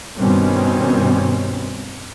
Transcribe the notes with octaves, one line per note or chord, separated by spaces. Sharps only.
G2 B2 D#3 G3 C4 C#4